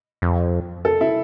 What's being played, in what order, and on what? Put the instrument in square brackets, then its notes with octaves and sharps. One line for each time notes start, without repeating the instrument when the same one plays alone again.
[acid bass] F2
[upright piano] A4
E4